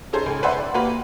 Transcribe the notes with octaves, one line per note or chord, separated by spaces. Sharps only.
C#4 D#4 G#4 A4 C5
C#2
B4 C5 D5 E5 F#5
D5
A#3 F#4 G4 B4